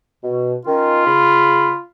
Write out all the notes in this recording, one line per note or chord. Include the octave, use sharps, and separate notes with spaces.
B2
D#3 C#4 F4
C#3 B5